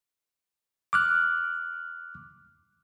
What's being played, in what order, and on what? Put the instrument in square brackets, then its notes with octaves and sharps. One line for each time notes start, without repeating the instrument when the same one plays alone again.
[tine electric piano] D6 F6 F#6